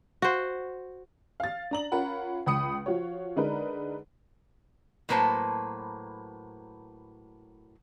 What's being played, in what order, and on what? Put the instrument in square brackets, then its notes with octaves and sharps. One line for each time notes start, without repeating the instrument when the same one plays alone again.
[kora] F#4 C5
[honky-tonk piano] F5 A6
D4 A#5 F#7
C#4 F4 A#4 F#5 B5
C#2 B5 D#6 C#7
F3 F4 F#4 C#5
D3 G#3 D4 D#4 A#4 B4
[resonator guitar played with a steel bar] A2 F#3 A#3 B4 C5 A5